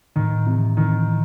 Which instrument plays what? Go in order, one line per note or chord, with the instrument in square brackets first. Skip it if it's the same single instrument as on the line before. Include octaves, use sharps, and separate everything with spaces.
[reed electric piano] A2 [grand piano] D#3
[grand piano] C3 [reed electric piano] E3
[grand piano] D#3 [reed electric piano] E3
[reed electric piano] E3